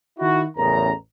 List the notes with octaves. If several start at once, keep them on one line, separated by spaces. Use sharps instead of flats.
D#3 D#4 E4 F#4
A1 E2 C#3 A#4 A#5